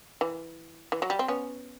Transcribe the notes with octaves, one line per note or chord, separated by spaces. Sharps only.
E3
E3
F#3
G3
C4
B3 C#4